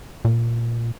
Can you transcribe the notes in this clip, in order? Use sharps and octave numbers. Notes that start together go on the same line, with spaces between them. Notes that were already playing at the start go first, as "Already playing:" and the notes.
A#2